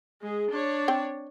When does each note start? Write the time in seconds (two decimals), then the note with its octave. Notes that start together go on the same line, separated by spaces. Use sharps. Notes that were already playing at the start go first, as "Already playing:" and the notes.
0.22 G#3 G#4
0.50 D4 C#5
0.88 C4 G5